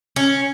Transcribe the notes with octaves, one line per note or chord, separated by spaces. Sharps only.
C#4